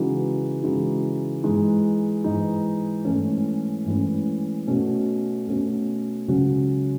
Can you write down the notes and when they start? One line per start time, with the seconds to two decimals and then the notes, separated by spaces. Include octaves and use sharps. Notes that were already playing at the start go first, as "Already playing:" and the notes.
Already playing: C#3 E3 G#3 D#4 F#4
0.62 C#3 E3 G#3 D#4 F#4
1.43 G#2 E3 G#3 D#4
2.24 G#2 E3 G#3 D#4
3.05 G#2 E3 A3 C#4
3.86 G#2 E3 A3 C#4
4.67 B2 A3 C#4 F#4
5.47 B2 A3 C#4 F#4
6.28 C#2 C#3 F#3 C#4 F#4